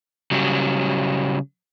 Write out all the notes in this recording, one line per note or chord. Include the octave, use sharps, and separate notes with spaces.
C#3 F#3 G3